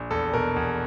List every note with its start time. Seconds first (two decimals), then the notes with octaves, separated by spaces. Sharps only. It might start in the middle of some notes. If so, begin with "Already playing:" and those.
Already playing: A#1
0.11 E2 A4
0.33 B2 A#4
0.56 E2